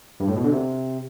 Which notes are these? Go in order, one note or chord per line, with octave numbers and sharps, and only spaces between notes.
G2
A2
B2
D3
C3